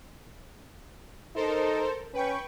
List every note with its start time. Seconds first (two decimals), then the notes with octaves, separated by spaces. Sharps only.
1.35 D#4 A4 A#4 C5
2.14 C#4 B4 G5 C#6